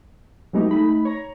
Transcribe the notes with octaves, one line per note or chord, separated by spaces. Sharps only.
F#3 G#3 A3 B3 D#4 G4
A3 D#4 B5
C#5 A#5